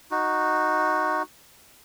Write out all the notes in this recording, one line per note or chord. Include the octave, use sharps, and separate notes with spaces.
D#4 F#4